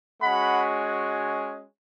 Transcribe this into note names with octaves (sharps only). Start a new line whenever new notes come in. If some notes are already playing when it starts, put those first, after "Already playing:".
G#3 C#4 F#4 F#5 B5